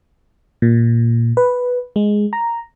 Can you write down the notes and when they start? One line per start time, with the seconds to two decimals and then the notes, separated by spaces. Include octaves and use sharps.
0.62 A#2
1.37 B4
1.96 G#3
2.33 A#5